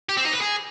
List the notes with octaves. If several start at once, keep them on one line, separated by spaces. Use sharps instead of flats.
G4
C4
D#4
B4
G#4